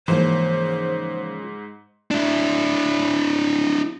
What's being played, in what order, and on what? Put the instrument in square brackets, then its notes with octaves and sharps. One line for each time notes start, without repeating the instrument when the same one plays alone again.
[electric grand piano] G#2 [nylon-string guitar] C#3 F3 A#3 [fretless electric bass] E3 [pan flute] C5
[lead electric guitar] D4 E4